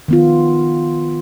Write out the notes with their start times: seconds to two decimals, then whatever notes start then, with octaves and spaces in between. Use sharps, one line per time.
0.08 D#3 B3 F4